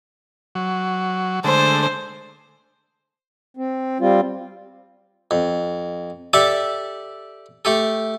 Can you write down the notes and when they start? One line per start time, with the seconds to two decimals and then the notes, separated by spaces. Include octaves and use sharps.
0.55 F#3
1.44 D3 G#3 A3 C5
3.57 C4
4.00 G3 C4 F4
5.31 F2
6.33 G4 A4 D5 E5 A5
7.65 A3 G4 A4